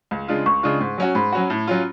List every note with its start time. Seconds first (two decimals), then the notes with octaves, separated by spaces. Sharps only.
0.11 C#2
0.28 C#3 G#3 D4 F4
0.46 C#2 C#6
0.63 C#3 G#3 D4 F4
0.81 G#2
0.98 F#3 C#4 F#4
1.15 G#2 B5
1.32 F#3 C#4 F#4
1.50 A2
1.67 F#3 C#4 F4